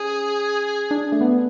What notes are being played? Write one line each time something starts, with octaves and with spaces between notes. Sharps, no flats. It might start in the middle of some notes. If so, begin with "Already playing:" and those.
Already playing: C#4 G#4
D4
A3
B3